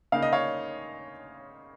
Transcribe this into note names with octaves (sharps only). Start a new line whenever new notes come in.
C#3 A#3 D#4 F5
D#5
C#5 F5